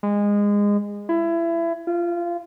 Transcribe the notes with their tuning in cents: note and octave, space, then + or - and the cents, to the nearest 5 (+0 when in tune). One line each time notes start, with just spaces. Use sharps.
G#3 -20
E4 +25
F4 -20